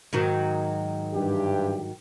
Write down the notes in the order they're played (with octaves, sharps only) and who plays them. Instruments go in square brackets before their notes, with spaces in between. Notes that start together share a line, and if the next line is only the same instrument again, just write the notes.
[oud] G#2 D#3 F#3
[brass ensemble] G2 E3 G4